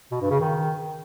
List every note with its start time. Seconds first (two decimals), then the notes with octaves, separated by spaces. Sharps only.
0.11 B2
0.21 G2
0.30 C#3
0.40 D#3